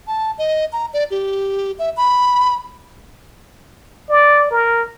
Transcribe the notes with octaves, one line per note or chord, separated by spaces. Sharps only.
A5
D#5
A#5
D5
G4
E5
B5
D5
A#4